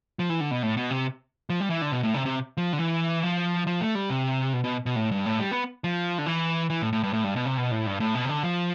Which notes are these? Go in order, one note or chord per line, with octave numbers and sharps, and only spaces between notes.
F3
E3
D3
B2
A2
B2
C3
F3
G3
E3
D3
B2
A2
C3
C3
F3
D3
E3
F3
F3
A3
G3
C3
B2
B2
B2
A2
G2
A2
G3
B3
F3
D3
E3
E3
A2
A2
G2
A2
G2
B2
C3
B2
A2
G2
A2
B2
C3
D3
F3